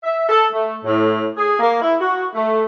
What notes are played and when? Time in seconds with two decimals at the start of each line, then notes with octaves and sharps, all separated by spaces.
0.03 E5
0.29 A4
0.53 A3
0.84 A2
1.37 G#4
1.60 A#3
1.82 E4
2.01 F#4
2.35 A3